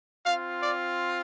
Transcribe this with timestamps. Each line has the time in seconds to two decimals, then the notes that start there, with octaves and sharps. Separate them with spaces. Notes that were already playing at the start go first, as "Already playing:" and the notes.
0.24 C4 F4 F5
0.61 D5